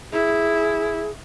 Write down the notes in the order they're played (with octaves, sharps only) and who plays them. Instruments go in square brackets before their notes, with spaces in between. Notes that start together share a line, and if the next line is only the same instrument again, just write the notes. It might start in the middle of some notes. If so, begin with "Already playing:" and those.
[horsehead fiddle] E4 [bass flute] G#4